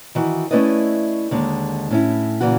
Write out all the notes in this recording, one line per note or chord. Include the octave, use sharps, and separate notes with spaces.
D#3 E3 F#4
A3 C#4 E4 B4 D5 D#5
D#2 D3 G#3
A2 C#4 E4
A#2 C#3 E3 F#4